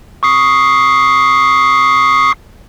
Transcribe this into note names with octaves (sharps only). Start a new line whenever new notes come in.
C#6 D#6 C7